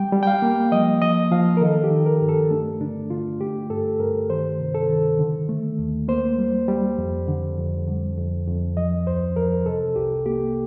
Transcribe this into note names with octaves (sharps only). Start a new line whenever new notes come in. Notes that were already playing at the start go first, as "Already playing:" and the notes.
Already playing: G3 G5
G3
G5
F5
A#3
F3 D#5
F3 D#5
F3 F5
A#4
D#3 A4
G4
D#3
A#4
G2
A4
A3 D4
D3 D4
D3 F4
A3 G4
G2 A4
G2 A#4
D#3 C5
C3
A4
D#3
D3
A3
D#2
A#3 C5
G3
G3
F2
D3
F2
D3
F2
F2
F3 D#5
D2 C5
F3 A#4
C3 A4
C2 G4
A#3 G4